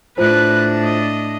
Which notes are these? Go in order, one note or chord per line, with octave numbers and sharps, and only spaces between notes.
A2 D4 F4 B4 C5 F#6
D#5